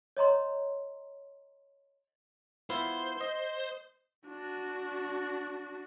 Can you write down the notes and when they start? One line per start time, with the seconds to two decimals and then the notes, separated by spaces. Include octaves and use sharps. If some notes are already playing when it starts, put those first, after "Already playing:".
0.17 C#5 D#5 A#5 C6
2.70 B3 E4 F4 C5
3.21 D#5
4.27 D4 F#4